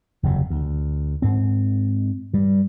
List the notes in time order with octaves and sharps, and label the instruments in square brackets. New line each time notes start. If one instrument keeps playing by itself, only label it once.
[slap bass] F#1 E2 C3
D2
G#2 C4
G2 G3